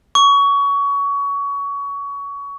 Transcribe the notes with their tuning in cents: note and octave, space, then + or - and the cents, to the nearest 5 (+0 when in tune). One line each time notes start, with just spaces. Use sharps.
C#6 +25